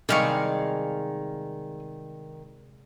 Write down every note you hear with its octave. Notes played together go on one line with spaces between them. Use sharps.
C3 D#3 G3 G#3 G#4 F5 C#6